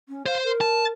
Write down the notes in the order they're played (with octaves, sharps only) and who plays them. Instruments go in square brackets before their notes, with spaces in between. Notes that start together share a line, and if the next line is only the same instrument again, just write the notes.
[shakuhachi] C#4
[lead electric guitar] C5 [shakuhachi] F5
[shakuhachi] A#4
[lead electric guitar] A5